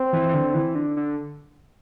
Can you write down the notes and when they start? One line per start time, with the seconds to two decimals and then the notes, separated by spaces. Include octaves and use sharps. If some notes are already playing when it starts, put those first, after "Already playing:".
Already playing: C4
0.13 E3
0.29 E3
0.34 D3
0.54 E3
0.75 D3
0.97 D3